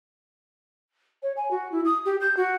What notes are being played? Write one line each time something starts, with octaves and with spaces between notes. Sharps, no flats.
C#5
G#5
F#4
E4
D#6
G4
G6
F#4